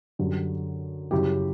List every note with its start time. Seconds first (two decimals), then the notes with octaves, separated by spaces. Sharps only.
0.19 F#2 D3 G3
1.11 F#2 C#3 G3 E4 G4